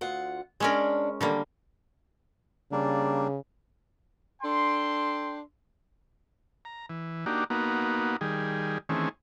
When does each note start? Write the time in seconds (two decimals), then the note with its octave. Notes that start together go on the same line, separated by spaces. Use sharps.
0.01 D2 F4 F#5
0.60 G#3 C#4 D4 A#4 C#5
1.21 D3 D#3 G3 A#3
2.72 C#3 G3 A#3 D4
4.42 D4 A4 G5 C6
6.65 A#5
6.90 E3
7.26 A#3 D4 D#4 F#4 G4
7.50 A#3 B3 D#4 F#4
8.21 D#3 G3 G#4
8.89 D#3 E3 A3 C4 C#4 G#4